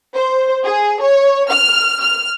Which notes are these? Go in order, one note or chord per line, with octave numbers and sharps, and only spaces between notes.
C5
G#4
C#5
F6
F6